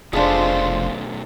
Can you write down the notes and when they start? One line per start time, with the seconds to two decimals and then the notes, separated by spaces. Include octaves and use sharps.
0.13 F1 B1 G#3 A3 D4 F4 C5